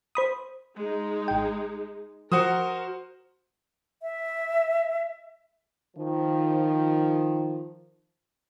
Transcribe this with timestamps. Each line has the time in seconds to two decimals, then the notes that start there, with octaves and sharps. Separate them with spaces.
0.15 C5 B5 D#6
0.78 G#3 D#4
1.28 G#1 G5
2.32 F3 F#4 A#4 C5 D#6
4.02 E5
5.97 D#3 F3